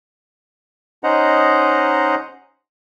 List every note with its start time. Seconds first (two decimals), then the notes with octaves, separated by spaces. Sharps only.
1.04 C#4 D#4 C5 D#5 F#5 A#5